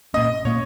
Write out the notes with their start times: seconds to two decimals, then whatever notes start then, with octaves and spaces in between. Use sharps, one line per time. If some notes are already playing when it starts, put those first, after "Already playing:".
0.14 A#2 A#3 C#4 D#5
0.45 A#2 A#3 C#4 C#5